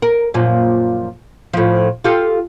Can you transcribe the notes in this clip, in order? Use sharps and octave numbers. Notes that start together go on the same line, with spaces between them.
A#4
F#2 A#2 F3
A2 F3
F4 G4 A4